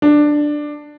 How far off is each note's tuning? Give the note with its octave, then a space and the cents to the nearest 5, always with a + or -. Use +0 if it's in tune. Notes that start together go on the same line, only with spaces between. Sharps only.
D4 +10